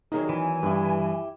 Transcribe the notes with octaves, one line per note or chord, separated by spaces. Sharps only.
E2 D#3 F#3 D#4 G#4
E3 G#5
G2 E4 G4